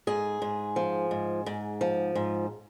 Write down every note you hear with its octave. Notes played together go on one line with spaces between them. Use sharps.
G#2 G#4
G#2
F3
G#2
G#2
F3
G#2